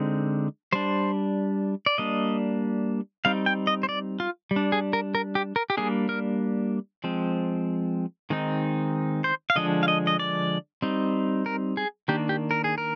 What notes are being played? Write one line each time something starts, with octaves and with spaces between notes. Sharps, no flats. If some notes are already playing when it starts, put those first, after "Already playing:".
Already playing: D3 G#3 C4 D#4
G3 D4 C5
D5
G3 A#3 D4 D#5
G3 C4 D#4 F5
G5
D#5
C5
D5
F4
G3
D4
G#4
A#4
A#4
G4
A#4
G4
G3 A#3 D4 G#4
A#4
F3 G#3 C4
D#3 G#3 C4 D#4
C5
F5
D3 F3 G#3 D4 D#5
F5
D#5
D#5
D5
G3 C4 D#4
A#4
G#4
D#3 A#3 D4 G4
G4
A#4
G#4
A#4